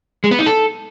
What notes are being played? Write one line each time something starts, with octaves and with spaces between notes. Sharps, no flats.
G#3
B3
D#4
A4